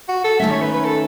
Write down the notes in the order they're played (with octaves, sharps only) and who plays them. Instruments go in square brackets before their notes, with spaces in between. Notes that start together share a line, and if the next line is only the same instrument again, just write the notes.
[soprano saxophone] F#4
A4
[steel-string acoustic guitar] D#3 A3 C#4 [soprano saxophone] E5
[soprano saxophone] C#5
B4
B4
A4